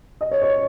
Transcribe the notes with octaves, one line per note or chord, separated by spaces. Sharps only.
D#5
C#5
C#5